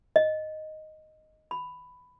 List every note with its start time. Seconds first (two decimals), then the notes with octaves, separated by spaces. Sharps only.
0.16 D#5
1.51 B5